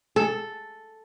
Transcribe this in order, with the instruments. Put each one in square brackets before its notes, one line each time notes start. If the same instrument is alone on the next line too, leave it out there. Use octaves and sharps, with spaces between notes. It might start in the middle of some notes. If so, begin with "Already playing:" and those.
[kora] A4